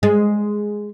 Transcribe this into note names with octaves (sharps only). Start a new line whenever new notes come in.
G#3